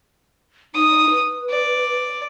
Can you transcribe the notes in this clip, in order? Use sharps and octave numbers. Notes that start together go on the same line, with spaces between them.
D#4 D#6
B4
D5